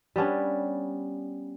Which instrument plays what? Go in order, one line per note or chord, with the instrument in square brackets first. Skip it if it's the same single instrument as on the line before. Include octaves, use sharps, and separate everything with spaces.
[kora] G3 B3 C#4 D4